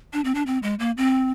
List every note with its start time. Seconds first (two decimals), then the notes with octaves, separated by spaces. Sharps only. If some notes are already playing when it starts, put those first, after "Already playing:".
0.13 D4
0.25 C4
0.35 D4
0.47 C4
0.63 G#3
0.79 A#3
0.97 C4